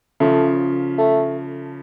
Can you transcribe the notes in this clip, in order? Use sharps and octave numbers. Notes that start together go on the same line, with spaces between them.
C#3 F3 A3
A3